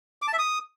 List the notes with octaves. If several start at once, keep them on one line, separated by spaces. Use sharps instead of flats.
D6
A5
E5
D#6